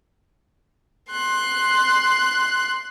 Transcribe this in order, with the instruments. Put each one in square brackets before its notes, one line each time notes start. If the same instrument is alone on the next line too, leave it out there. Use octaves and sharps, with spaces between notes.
[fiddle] C6 F#6